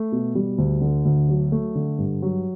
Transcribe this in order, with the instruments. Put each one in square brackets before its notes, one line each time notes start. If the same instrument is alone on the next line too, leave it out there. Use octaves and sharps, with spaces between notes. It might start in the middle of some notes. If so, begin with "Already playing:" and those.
Already playing: [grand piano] A3
B2
G3
D2
D3
D2
F#3
A3
D3
G2
F#3